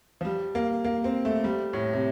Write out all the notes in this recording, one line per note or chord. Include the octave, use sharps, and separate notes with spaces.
F3
G3
A#3
A#3
C4
A3
G3
A2
C3